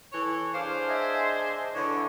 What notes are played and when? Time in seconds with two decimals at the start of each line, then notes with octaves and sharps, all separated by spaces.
0.12 E3 A4 C#5
0.54 D4 G#4 C5 F5 D6
0.88 D#5 E5 G#5
1.73 D3 E3 C#5